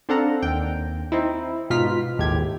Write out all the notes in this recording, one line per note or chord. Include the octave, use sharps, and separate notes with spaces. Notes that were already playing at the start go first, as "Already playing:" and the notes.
C4 D4 A4 F5 F#5 A#5
D#2 G5
C4 D#4 E4
G#2 B2 D#4 F4 F6 B6
G#1 D#2 A2 G4 G#6